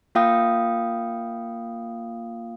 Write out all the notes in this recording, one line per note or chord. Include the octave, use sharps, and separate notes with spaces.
A#3 F4 F5 G5 D#6